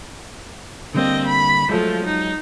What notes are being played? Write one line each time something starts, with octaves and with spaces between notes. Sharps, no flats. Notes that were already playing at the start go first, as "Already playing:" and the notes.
D3 G3 A#3 C4 D#5
B5
F3 F#3 G#3 A3
D#4